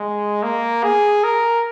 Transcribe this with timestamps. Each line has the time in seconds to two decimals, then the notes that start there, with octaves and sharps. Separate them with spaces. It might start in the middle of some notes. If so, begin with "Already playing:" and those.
Already playing: G#3
0.43 A#3
0.84 G#4
1.24 A#4